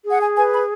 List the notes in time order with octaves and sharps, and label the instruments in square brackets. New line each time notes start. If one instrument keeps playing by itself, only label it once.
[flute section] G#4
F#5
G#5
B4 G#5
B5